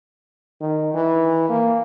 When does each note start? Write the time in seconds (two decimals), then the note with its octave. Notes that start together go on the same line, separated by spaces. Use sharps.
0.61 D#3
0.94 E3
1.49 A#3